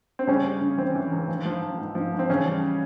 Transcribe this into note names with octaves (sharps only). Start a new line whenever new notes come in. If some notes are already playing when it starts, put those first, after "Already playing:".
C4
C#3 G3 C#4
G3
C#3
E3 C4
E3
C#2
F3
F3
F3
G#2
F3
G#2
C4
C#3 E3 C#4
G3